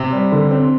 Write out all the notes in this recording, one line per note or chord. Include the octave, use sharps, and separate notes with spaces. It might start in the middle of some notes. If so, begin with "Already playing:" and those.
Already playing: C3
G3
D3
C4